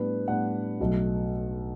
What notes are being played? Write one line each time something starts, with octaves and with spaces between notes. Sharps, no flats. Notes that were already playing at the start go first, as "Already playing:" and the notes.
Already playing: A2 G3 B3 D4 B4
A2 G3 B3 D4 F#5
B1 B2 F#3 A3